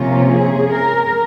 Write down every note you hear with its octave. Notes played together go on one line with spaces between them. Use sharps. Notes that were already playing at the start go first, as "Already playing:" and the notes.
Already playing: C3 F3 A#3 C#4 F4
G#4
A#4